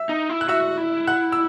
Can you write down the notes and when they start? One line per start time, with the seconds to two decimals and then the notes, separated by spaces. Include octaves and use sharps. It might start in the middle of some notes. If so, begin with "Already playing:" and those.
Already playing: E5 E6
0.09 D#4
0.30 E4
0.41 F#6
0.48 F#4 E5 E6
0.78 E4
1.07 F#5 F#6
1.32 E6